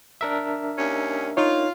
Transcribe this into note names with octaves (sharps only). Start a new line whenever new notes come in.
D4 A#4 E5
D#2 D#3 C#4
D#4 F4 C#5